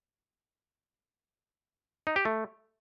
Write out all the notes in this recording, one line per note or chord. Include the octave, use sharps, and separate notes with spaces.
D#4
G4
A3